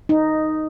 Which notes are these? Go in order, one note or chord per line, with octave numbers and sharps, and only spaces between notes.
D#4